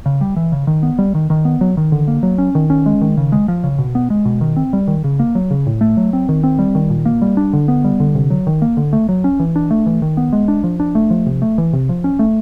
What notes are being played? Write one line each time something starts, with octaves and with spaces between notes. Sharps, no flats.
C#3
G3
E3
C#3
D#3
B3
G3
D#3
D#3
B3
F#3
D#3
D3
A#3
F#3
C#4
D#3
C#4
G#3
D#3
C#3
G#3
F3
C#3
B2
B3
G#3
B2
D#3
C4
G3
D#3
C#3
A#3
F#3
C#3
A2
A3
F#3
C4
D#3
C4
G3
D#3
A#2
A#3
G3
D4
D3
B3
G3
D3
C3
F#3
D#3
A#3
D3
A3
F#3
C#4
E3
D4
A3
E3
D#3
B3
G#3
D4
F3
D4
A3
F3
C3
A3
E3
C3
F3
C#4
A3